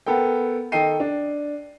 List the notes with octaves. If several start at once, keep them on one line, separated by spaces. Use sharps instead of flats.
B3 A4 A#4 G5
D#3 A4 D#5 G5 C7 D#7
D4